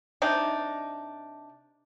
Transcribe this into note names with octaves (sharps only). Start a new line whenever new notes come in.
C3 D4 D#4